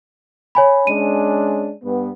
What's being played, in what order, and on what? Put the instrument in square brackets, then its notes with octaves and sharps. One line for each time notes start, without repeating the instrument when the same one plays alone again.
[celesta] C#5 G#5 B5
[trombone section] G#3 C#4 D4 [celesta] D#7
[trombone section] G2 B3